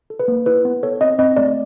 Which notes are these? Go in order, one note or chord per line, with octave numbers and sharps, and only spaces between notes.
A4
B4
A#3
E4 B4
B3
A4 C#5
C4 D#5
C4 D#5
A3 D5